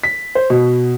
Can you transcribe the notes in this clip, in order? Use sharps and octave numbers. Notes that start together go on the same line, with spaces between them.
B6
C5
B2